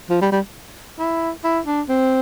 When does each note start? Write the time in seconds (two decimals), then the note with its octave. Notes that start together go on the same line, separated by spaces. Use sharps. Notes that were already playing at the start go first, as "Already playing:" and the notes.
0.10 F3
0.21 G3
0.32 G3
0.99 E4
1.44 E4
1.66 D4
1.89 C4